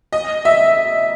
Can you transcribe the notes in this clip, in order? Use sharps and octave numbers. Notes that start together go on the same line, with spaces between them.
D#5
E5